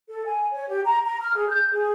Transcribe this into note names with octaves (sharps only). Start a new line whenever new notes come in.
A4
G#5
C#5
G4
A#5
A#5
F6
G#4
G6
G#4